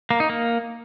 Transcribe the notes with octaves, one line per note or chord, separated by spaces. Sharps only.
A#3
D#4
A#3